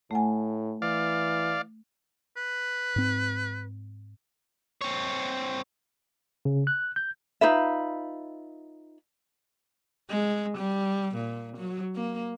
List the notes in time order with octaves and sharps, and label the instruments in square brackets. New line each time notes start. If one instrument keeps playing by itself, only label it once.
[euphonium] A2 [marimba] A3 F#5 G#5
[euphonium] E3 [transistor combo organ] D5 F5
[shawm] B4
[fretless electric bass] G#2 C4
[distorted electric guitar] C4 C#5
[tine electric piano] C#3
F#6
G6
[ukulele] D#4 F4 B4 E5
[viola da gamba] G#3
G3
A#2
F#3
A#3